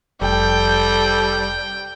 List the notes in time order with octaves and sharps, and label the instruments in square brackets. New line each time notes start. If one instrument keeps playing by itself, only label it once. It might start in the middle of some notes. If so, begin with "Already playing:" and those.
[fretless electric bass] F1 [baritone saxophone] G3 [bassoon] A4 [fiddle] G5